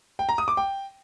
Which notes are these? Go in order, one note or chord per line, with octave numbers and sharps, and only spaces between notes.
G5
A#5
D#6
D6
G5